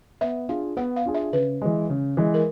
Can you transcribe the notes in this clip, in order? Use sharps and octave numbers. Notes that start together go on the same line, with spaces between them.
B3 E5
D4 F4 G#4 F5
B3 F#5
F5
D4 F4 G#4
E5
C#3 B4
E3 G#3
C#3
E3 G#3
A#4